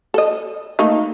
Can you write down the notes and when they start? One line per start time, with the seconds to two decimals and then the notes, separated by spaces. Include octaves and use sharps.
0.14 A4 D#5
0.79 A3 A#3 D#4